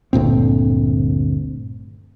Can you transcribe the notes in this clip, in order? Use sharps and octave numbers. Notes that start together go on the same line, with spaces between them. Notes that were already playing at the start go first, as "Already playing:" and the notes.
G1 D2 A#2 C4